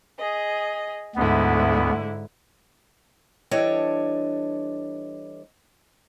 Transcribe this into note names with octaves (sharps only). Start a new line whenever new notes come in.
G#4 D#5
D2 G#2 D3 B3 E4
E3 G3 D4 A4 C#5 D#5